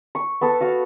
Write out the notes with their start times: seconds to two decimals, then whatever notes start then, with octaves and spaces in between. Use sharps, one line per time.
0.15 C#6
0.41 B3 A4
0.61 F#4 F5